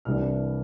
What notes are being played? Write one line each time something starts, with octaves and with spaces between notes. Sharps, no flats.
C2 C3 E3 G3 D4 F6